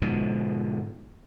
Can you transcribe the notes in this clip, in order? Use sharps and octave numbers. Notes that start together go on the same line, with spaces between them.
G#2 B2 D3 F3